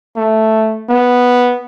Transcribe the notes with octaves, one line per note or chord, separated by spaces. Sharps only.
A3
B3